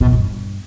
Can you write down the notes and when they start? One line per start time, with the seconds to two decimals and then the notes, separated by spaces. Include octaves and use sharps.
0.01 B2
0.07 F2
0.13 G2